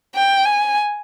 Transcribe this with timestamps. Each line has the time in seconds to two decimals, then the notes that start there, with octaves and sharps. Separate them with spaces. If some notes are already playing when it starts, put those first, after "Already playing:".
0.15 G5
0.45 G#5